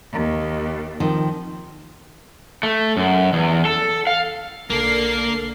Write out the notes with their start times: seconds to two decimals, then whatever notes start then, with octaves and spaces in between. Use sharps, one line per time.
0.12 D#2
1.00 D#3 F3 C4
2.63 A3
2.97 F#2
3.33 E2
3.65 A4
4.07 F5
4.70 B1 D3 A#3 A4 A#4 C7